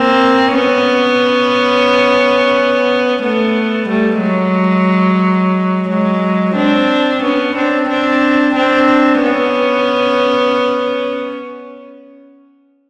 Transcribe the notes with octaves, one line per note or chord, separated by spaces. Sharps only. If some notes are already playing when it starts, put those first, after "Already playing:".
Already playing: A#3 C4
B3 C#4
A3 B3
G3 A3
F#3 G#3
F#3 G#3
C4 D4
B3 C#4
C4 D4
C4 D4
C4 D4
B3 C#4